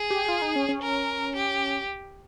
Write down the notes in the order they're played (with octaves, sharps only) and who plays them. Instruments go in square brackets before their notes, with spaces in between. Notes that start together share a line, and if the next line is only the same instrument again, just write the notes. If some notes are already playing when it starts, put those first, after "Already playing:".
Already playing: [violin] G#4
[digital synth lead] G4
F4
D#4
C#4
C#4
[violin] A#4
G4